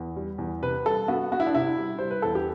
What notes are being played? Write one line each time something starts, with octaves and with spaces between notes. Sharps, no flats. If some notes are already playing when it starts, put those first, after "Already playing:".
Already playing: E2
G3
E2
C3 B4
G3 A4
B3 F#4
B3 F#4
E4
D4
C3 E4
G3
G3 C5
B4
E2 A4
G4